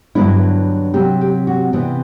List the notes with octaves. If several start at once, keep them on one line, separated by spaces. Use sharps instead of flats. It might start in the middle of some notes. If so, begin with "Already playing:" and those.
G2 D3 F#3 B3 D4 E4
C3 F#3 C4 G4
G4
F#4
C3 E3 B3 D4